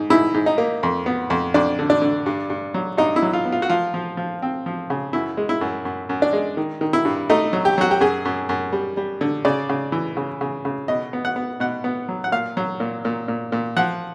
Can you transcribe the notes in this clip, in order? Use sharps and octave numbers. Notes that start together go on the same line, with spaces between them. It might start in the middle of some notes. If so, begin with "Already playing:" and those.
Already playing: G#2
G#2 E4
G#2
D#4
A#3
F2
B3
F2
F2 D4
D3
D4
D3
G2
G2
F#3
G2 D#4
E4
F#3
F4
B3
F4
F#4
F3 F4
F3
F3
C4
F3
C#3
F#2 E4
G#3
E4
F#2
F#2
F#2
D4
G#3
D#3
D#3
E4
G2
A3 D#4
F#3
G4
F#3 F#4
G4
F#2 G#4
F#2
F#2
G3
G3
D3
C#3 D5
C#3
E3
C#3
C#3
C#3
B2 D#5
B3
F#5
B3
B2 F#5
B3
F#3
F#5
A#2 F5
F#3
A#2
A#2
A#2
A#2
F3 F#5